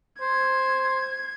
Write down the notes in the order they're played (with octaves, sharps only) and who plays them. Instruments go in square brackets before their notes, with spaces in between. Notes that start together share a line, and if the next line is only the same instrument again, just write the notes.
[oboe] C5 [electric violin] G#6